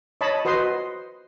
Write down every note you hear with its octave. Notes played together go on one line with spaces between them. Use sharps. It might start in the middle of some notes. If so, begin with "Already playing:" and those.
C#5 D#5 A5 B5
F#4 B4 C5 D#5 C6